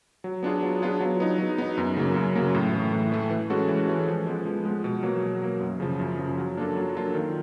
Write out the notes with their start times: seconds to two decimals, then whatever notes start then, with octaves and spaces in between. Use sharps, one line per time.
0.24 F#3
0.43 B3 D4 F4 G#4
0.63 F#3
0.82 B3 D4 F4 G#4
1.00 F#3
1.20 B3 D#4
1.38 F#3
1.58 B3 D#4
1.78 F#2
1.97 C#3 F#3 A#3
2.16 F#2
2.35 C#3 F#3 A#3
2.54 A2
2.73 E3 A3
2.93 A2
3.12 E3 A3
3.30 E3
3.50 G#3 C#4 F#4 A4
3.68 E3
3.88 G#3 C#4 F#4 A4
4.08 F3
4.27 G#3 B3
4.45 F3
4.65 G#3 B3
4.84 B2
5.03 F#3 A#3
5.23 B2
5.42 F#3 A#3
5.60 F#2
5.80 C#3 F3
6.00 F#2
6.19 C#3 F3
6.38 F#3
6.57 A#3 D4 F4 A4
6.76 F#3
6.95 A#3 D4 F4 A4
7.14 D#3